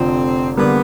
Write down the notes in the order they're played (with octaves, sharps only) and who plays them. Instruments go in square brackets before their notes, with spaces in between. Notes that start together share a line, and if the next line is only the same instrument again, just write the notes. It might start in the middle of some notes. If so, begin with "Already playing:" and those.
Already playing: [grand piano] F1 F2 D3 F3 [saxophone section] C4
[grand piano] D3 G3 A#3 [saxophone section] B3